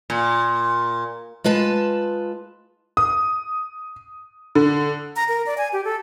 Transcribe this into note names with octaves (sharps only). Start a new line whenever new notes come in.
A#2
G#3 F4 B4 A5
D#6
D3
A#5
A#4
D5
G#5
G4
A4